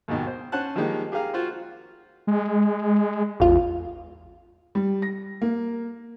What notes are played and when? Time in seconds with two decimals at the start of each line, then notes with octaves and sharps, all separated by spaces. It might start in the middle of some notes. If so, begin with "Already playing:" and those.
0.08 D#2 G#2 B2 D#3
0.27 C5
0.52 C#4 C5 F#5 A5 F#6
0.76 D#3 F3 G3 G#3 A#3 D#4
1.12 G4 G#4 A#4 F5 A#5
1.34 F4 F#4 C5
2.27 G#3
3.40 A1 E2 F4
4.75 G3
5.02 A#6
5.42 A#3